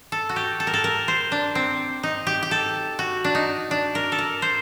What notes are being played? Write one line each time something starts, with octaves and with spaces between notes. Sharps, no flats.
A4
F#4
G4
A4
A#4
A4
A#4
C5
D4
C4
D#4
G4
G4
A4
F#4
D4
D#4
D4
A#4
A4
A#4
C5